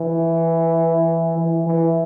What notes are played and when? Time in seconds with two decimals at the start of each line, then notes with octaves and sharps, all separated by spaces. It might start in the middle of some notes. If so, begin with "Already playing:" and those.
Already playing: E3
1.38 E3
1.66 E3